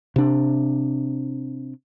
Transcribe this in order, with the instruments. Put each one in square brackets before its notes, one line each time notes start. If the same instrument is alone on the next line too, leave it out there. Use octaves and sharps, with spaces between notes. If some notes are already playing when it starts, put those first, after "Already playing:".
[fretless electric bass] C3 D4